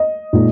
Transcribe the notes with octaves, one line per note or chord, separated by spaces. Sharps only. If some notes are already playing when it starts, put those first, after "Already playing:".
Already playing: D#5
A#2 G#3 D#4